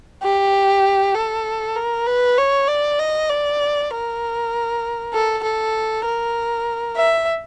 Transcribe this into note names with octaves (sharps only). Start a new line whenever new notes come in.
G4
A4
A#4
B4
C#5
D5
D#5
D5
A#4
A4
A4
A#4
E5